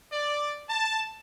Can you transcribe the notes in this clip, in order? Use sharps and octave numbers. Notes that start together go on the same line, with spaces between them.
D5
A5